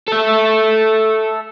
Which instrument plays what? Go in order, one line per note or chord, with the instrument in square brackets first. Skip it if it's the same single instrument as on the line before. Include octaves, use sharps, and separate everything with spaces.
[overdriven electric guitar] A4 E5